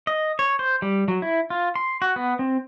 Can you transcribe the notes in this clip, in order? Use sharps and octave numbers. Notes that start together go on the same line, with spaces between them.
D#5
C#5
C5
G3
F#3
E4
F4
C6
F#4
B3
C4